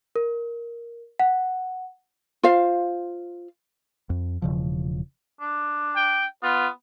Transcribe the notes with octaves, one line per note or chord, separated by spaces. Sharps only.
A#4
F#5
F4 C5 F5
F2
E1 C#3 F3
D4
G5
B3 F4